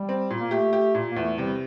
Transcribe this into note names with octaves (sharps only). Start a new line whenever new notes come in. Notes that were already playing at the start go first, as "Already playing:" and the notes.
Already playing: G3
C4
A#2
A#3
A3 G4
G4
A#2
A#3
E2 A3
C3 G3